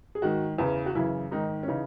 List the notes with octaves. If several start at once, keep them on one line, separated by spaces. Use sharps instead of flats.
G#4
G#2 D#3 F#4
E2 C#3 E3
F#4
F#2 C#3 E3 E4
G#2 D#3 D#4
C#4
C#3 E3 D#4